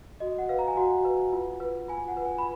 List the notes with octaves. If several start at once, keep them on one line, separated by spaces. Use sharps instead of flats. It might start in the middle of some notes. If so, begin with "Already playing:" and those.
F#4 D#5
F#5
B4 F5
A#5
G#5
F#4 F#5
B4
F4
B4
F4 G#5
F#5
B4
G#5
B5